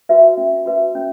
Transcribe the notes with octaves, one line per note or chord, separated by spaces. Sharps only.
F#4 B4 E5
C#4
F#4 B4 E5
C#4